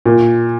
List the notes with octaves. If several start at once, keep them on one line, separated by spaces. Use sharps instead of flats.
A#2